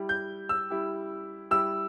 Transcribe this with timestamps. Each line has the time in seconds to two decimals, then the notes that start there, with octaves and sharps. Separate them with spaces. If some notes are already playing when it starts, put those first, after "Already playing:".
Already playing: G3 E4 G4
0.09 G6
0.49 E6
0.70 G3 E4 G4
1.51 G3 E4 G4 E6